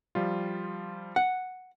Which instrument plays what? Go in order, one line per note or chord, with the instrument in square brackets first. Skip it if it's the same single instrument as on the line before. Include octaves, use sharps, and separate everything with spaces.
[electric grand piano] F3 G3 F4
[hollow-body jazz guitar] F#5